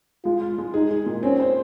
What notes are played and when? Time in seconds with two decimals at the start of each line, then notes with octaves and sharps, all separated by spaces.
0.25 G#3 F4
0.42 F4
0.58 G#3
0.74 D#4 G#4
0.91 G#4
1.06 A#2
1.23 C4 C#4
1.40 C5